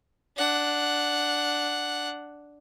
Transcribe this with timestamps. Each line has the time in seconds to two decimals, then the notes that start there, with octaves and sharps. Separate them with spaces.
0.37 D4 F#5